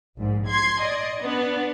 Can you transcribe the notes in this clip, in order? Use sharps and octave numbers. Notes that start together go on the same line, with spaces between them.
A#1 G#2
C6 G#6
D5 D#5
B3 D4